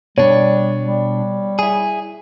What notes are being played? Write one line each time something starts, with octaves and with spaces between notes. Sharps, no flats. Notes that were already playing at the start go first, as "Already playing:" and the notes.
B2 G3 D4 C#5
G3
E4 G#4